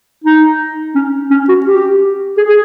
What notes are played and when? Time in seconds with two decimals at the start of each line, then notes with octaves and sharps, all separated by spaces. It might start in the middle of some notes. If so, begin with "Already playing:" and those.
0.24 D#4
0.95 C#4
1.31 C#4
1.49 F#4
1.66 G4
2.37 G#4
2.49 G#4